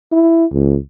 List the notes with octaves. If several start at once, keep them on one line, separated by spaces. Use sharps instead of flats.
E4
C#2